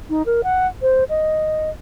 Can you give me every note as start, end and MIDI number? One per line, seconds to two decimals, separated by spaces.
0.10 0.23 63
0.26 0.41 70
0.44 0.67 78
0.82 1.04 72
1.09 1.70 75